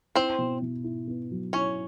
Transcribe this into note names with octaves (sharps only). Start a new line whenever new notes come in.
C4 E4 C5
B2
B2
E4
B3
F#3
C#4 E4 C#5